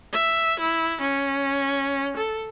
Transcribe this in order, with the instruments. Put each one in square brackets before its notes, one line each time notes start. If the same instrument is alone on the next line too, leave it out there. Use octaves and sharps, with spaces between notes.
[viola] E5
E4
C#4
A4